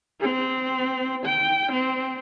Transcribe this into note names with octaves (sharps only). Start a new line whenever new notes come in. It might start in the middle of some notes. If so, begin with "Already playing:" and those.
C4
G5
C4